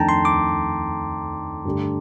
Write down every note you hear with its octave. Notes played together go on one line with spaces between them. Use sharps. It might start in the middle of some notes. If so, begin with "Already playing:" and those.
Already playing: F2 D#3 A3 D4 G5 A5 A#5
C6
D6
G2 D3 A3 D4 G4